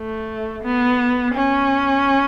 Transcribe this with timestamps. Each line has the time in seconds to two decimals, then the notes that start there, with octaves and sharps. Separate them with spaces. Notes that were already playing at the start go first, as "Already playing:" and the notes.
Already playing: A3
0.63 B3
1.34 C#4